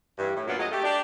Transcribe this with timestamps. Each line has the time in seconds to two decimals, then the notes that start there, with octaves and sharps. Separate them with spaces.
0.19 G2 E3
0.36 A2
0.48 F#2 A#2 F#3 B3 D4 F4
0.59 F2 F#3 G#3 D#5
0.72 A3 G4
0.84 D4 G4